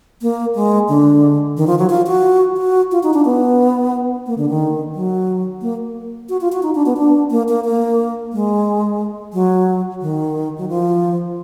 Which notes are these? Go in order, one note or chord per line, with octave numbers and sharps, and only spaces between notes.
A#3
G#3
D3
D#3
F3
F#3
F4
F#4
F#4
F4
D#4
D4
B3
A#3
D3
D#3
F#3
A#3
F#4
F4
F#4
D#4
D4
B3
D4
A#3
A#3
A#3
G#3
F#3
D#3
F#3
F3